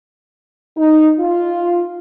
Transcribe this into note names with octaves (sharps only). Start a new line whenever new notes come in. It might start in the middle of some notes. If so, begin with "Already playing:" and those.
D#4
F4